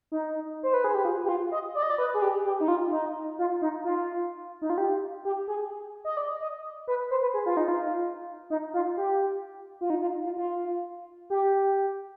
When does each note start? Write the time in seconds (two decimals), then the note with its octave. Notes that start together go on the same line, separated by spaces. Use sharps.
0.12 D#4
0.63 C5
0.74 B4
0.84 G#4
0.94 G4
1.05 F4
1.24 G4
1.29 F4
1.52 D#5
1.75 D5
1.82 D#5
1.90 D5
1.98 B4
2.14 G#4
2.22 G4
2.45 G4
2.60 D#4
2.68 F4
2.91 D#4
3.39 F4
3.62 D#4
3.84 F4
4.62 D#4
4.70 F4
4.78 G4
5.25 G4
5.48 G#4
6.05 D#5
6.17 D5
6.41 D#5
6.87 B4
7.11 C5
7.22 B4
7.34 G#4
7.46 F4
7.57 D#4
7.68 F4
8.50 D#4
8.74 F4
8.97 G4
9.81 F4
9.90 D#4
10.02 F4
10.25 F4
10.37 F4
11.30 G4